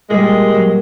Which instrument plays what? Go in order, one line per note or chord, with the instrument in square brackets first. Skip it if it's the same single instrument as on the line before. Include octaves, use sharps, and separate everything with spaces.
[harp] A#2 G3 [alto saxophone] G#3
[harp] F#3